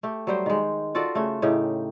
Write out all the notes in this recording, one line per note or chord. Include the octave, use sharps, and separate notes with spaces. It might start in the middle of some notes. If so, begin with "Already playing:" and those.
A3 G4
F#3 G3 C5
D#3 G#3
F4 F#4 A4 D5
C#3 A3
A2 C#3 D#4 G4